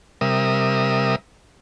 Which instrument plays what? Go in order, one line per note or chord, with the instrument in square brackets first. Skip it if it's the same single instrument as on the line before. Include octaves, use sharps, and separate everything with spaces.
[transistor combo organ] C3 G3 A#4 E5 D#6